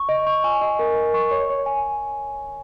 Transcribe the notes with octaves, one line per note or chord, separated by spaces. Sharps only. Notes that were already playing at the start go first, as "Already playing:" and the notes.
Already playing: C#6
D#5
C#6
G#5
D#5
A#4
A#4
C#6
C#5
C#5
G#5